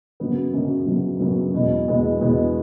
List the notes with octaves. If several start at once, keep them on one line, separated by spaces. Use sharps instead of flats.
F#2 C#3 F#3 B3
F#2 C#3 F#3 B3
F#2 C#3 F#3 B3
F#2 C#3 F#3 B3
E2 B2 G#3 B3 E4
E2 B2 G#3 B3 E4
E2 B2 G#3 B3 E4